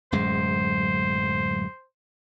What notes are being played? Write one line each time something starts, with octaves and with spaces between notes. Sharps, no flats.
D1 F#2 G#3 C5